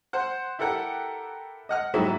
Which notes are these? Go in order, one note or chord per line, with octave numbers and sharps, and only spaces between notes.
C5 F#5
E4 G4 A4 A#4 F#5
D#5 F#5 F6
G#2 F#3 G#3 A#3 E4 G4